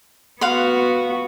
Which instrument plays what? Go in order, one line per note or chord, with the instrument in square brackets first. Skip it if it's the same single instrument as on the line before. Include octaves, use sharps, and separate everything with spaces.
[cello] B3 F#4 [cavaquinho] F5 F#5 C6